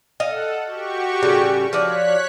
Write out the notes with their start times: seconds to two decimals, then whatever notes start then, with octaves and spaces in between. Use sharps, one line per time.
0.20 A4 D#5 F5 F#5
0.66 F#4 G4 C#6
1.22 A2 C#3 G3
1.73 F3 F#4 C#5 D5 F#6 B6